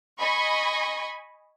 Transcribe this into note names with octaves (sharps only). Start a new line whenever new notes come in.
D#5 G#5 B5 C#6